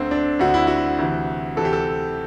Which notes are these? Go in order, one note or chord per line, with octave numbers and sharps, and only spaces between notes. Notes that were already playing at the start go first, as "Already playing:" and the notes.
Already playing: D2 D3 C4
D4
D2 D3 F#4
E4
F#4
D2 C3 E3
D2 C3 E3 A4
G4
A4